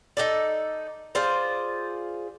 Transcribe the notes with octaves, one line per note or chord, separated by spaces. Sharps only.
D#4 A4 D5
F4 G#4 C5 D5